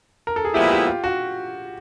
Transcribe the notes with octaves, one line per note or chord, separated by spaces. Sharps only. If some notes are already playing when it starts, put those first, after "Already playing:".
A#4
A4
G#4
A#2 F3 G#3 B3 E4 G4
G4
F4
F#4